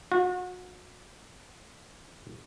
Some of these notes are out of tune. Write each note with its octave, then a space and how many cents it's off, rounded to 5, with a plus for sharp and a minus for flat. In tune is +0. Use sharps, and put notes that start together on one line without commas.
F#4 -35